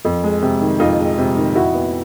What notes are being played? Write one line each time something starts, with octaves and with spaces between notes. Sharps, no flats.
F2
G#3
C3
D#3
F2 D#4 F4
G#3
C3
D#3
F2 E4 F#4
B3